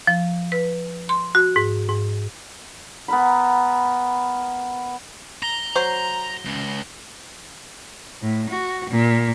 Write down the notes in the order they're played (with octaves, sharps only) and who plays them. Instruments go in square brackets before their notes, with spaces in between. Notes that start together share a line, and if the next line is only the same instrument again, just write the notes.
[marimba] F3
B4
C6
F#4
G#2
G#2
[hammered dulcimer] B3 A#4 B5
[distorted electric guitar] A#5 [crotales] A#6 G7
[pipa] F#3 C5
[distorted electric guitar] C#2
[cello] A2
F#4
A#2